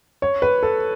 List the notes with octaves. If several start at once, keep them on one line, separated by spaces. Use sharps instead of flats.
C#5
B4
A4